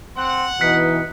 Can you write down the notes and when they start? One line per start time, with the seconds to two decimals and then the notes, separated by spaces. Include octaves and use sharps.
0.17 C4 F#5
0.61 B2 E3 D#4 F#6 B6 C#7